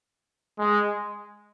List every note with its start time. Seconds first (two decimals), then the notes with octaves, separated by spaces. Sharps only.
0.58 G#3